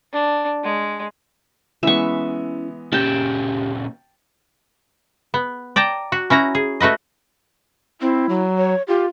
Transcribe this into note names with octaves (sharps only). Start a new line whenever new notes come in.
D4
G#3
E3 G#3 B3 C#4 E4 E5 C#6
A#2 C#3 C#4 G4 G5 A5
B3
D5 G5 A5 A#5
F#4
C#4 E4 F#4 A#5
G#4
A3 F#4 B4 D#5
C4 E4
F#3
C#5
F4 G4